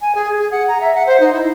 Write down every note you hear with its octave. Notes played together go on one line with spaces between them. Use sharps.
G#5
G#4
G#4
F#5
A#5
E5
F#5
C5
D#4
E4